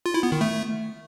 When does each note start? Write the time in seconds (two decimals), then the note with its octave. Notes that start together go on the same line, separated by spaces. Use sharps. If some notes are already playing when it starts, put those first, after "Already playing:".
0.06 F4
0.14 E4
0.23 B3
0.32 D#3
0.41 A3